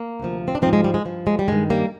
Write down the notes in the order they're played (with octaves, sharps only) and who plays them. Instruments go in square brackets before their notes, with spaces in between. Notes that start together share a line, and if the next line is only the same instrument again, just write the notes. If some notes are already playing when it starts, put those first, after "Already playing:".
Already playing: [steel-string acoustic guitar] A#3
D2 C3 F3
C4
D4
F3 C4 D#4
G#2
G#3
G3
G#3
G2 F3
G#3
G3
G2 D#3 G#3
G3 A#3